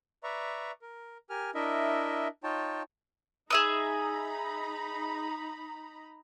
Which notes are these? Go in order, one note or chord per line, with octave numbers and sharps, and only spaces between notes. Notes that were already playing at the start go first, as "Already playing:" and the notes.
B4 D5 E5 A#5 C#6
A#4
G4 A#4 G#5 F6
D4 E4 A#4 D#5 E5
D#4 F4 C#5 G5 A5
D#4 G#4 E5 A#5 B5 D#6